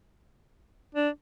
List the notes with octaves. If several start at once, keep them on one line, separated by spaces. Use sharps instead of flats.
D4